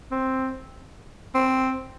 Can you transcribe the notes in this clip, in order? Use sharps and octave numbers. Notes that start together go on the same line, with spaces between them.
C4
C4